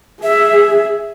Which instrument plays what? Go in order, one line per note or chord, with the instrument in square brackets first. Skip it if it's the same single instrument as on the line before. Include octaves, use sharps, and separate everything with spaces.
[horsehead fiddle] G#4 [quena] E5